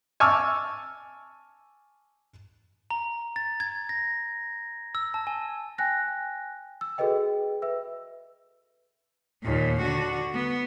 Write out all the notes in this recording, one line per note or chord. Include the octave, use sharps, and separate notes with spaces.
G#5 A5 C#6 D6 E6 F6
A#5
A6
G#6
A#6
E6
A5
G#5
G5 G#5 F#6 A#6
E6
F#4 G#4 A4 B4 D#5 G5
B4 E5 E6
D#2 A#2
D3 F#4
B3